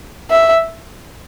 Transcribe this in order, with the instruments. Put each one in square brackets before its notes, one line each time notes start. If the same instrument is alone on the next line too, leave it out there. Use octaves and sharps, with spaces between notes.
[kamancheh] E5